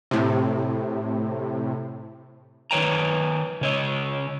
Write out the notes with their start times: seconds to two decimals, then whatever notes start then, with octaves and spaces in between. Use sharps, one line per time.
0.11 A2 C3
2.71 D#3 B4 C#5 G5 A#5
3.61 C#3 C#5 D#5